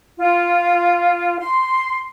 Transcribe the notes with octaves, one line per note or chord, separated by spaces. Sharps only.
F4
C6